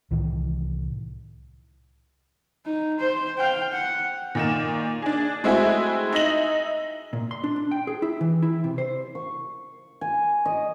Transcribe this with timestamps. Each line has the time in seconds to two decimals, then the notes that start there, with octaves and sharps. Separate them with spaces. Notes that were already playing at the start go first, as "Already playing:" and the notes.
0.11 C2 A2 D#3 E3
2.65 D#4
2.99 C5
3.38 F5 G5
3.72 F#5
4.35 A#2 D#3 E7
5.02 D4 G#4
5.44 G#3 A3 C4 E4 F#4 G#4
6.13 D#4 E5 A#6 F#7
7.13 A#2
7.31 C6
7.44 D4
7.56 D4
7.71 G5
7.87 G#4
8.02 E4
8.21 E3
8.42 E4
8.64 C3
8.78 C5
9.15 C#6
10.01 G#5
10.46 D#5